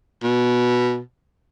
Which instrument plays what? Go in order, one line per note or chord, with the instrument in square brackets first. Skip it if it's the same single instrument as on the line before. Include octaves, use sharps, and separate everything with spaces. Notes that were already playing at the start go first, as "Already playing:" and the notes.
[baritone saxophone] B2